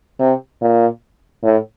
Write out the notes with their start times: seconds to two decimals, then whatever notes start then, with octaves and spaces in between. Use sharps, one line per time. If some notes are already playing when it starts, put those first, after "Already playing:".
0.20 C3
0.61 A#2
1.43 A2